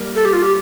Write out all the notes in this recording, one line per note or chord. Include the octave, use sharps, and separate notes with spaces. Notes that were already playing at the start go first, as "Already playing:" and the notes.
Already playing: G3 A#3
A4
G4
F4
G4